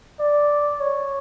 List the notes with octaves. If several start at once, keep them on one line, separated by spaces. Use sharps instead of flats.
D5
C#5